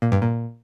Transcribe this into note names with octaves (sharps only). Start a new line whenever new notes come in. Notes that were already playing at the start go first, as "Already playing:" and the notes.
A#2
G2
A#2